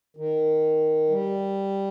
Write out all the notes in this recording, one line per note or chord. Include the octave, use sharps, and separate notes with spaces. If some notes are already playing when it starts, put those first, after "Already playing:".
D#3
G3